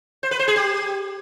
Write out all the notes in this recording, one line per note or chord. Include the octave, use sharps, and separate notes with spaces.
C5
B4
C5
G#4
G4